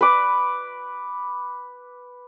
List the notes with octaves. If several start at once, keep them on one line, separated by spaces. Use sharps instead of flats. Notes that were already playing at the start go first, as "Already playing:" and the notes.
B4 D6